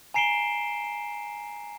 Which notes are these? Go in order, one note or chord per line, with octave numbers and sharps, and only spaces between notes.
G#5 A#5 C7 D7 E7 G7